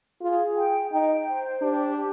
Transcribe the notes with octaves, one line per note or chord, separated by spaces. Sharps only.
F4 G#4
G5
D#4 G5
C5
D4 G4
G4